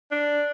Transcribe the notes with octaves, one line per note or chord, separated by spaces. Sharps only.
D4